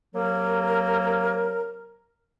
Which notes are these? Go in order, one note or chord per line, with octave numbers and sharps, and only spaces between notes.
C3 F#3 A#3 A#4